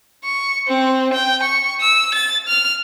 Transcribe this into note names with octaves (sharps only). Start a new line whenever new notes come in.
C#6
C4
G5
C#6
E6
A6
F6